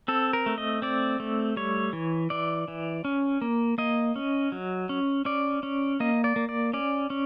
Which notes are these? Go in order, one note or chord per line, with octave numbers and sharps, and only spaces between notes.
C4 A4
A#4
A3
D#5
C4 D5
A3
G3 C#5
E3
E3 D5
E3
C#4
A#3
A#3 D#5
C#4
F#3
C#4
C#4 D5
C#4
A#3 D#5
D5
A#3
D5
C#4 D5
C#4